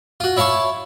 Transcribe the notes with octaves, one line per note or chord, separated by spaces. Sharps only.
F4 F#4
E4 C#5 F5 A5 C#6